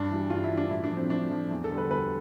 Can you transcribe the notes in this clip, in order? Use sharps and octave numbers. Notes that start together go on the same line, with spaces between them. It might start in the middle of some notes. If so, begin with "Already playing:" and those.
Already playing: G2 D4
E3 G3
G2 F4
E4
E3 G3
D4
A2 E4
D4
F3
C4
A2 D4
F3
E2
A4
D3 G3
B4
E2 B4